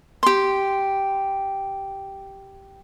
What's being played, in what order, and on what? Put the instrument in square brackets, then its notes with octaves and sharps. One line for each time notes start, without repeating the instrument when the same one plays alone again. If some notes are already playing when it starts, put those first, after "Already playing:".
[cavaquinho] G4 C6